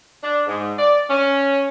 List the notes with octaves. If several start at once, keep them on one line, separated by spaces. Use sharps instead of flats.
D4
G#2
D5
C#4